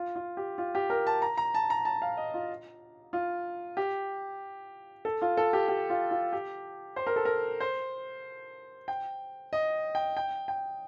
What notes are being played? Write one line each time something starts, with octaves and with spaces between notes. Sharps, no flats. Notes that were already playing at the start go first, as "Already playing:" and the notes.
Already playing: F4
F4
G4
F4
G4
A#4
A5
A#5
A#5
A5
A#5
A5
F5
D#5
F4
F4
G4
A4
F4
A4
G4
G4
F4
F4
G4
C5
A#4
A4
A#4
C5
G5
D#5
G5
G5
G5